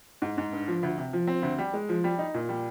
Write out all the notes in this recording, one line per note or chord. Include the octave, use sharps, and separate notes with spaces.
G#2
G#2
G2
F3
D2
C3
F3
C4
D2
G3
G#3
F3
G3
D#4
A#2
G3